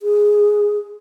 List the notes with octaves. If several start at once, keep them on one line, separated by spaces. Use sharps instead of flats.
G#4